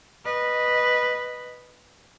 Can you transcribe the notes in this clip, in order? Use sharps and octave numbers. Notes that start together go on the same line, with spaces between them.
B4 D#5